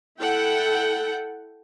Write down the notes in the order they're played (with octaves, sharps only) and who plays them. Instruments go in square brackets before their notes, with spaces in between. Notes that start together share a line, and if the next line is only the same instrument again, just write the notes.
[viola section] E4 A4 F#5 G5